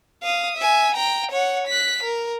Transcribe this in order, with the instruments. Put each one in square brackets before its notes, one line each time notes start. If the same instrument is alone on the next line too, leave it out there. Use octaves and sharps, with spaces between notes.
[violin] F5 D#6
E5 G#5
G5 A#5
C#5 F#5
F#6 B6
A#4